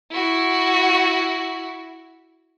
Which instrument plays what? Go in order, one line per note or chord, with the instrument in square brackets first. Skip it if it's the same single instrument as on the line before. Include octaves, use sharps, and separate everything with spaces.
[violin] E4 F#4